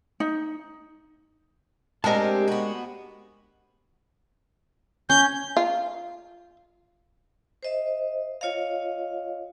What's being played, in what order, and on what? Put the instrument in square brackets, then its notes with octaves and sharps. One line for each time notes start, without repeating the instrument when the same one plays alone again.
[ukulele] D#4
[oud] G#3 D4 A#4 [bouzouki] C4 G4 [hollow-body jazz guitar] D#5 A5
[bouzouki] B3 F#4
[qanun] C#4 [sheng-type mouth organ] G6
[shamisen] F4
[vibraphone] C5 D#5 E5
F4 C#5 D#5 F5